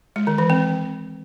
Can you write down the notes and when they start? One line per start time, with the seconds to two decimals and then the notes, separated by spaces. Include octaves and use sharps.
0.16 G#3
0.27 D#3
0.38 E3
0.50 C4